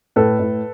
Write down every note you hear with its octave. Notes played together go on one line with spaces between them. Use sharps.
A2 A4 B4
A2